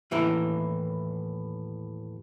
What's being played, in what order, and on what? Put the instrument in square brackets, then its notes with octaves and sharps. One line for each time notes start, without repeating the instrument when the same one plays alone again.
[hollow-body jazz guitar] D#2 A2 E3 A#3 A#4